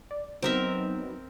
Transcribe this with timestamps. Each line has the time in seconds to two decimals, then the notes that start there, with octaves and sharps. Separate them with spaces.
0.11 D5
0.42 F#3 B3 C4 D#4 A#4 E5